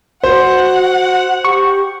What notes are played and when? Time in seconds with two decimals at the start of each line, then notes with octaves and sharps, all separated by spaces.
0.24 F#4 C5 F#5
1.45 G4 C#6